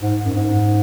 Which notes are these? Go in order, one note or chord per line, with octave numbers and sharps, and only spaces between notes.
G#2
F#2
G#2